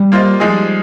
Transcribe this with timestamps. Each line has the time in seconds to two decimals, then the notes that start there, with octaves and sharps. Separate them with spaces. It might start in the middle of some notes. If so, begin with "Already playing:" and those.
Already playing: G3
0.12 A#3 F4 C5 D#5
0.40 F3 G#3 D#4 G#4